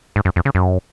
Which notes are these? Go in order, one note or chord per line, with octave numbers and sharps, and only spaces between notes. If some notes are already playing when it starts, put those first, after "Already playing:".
G#2
F#2
F2
C#3
F#2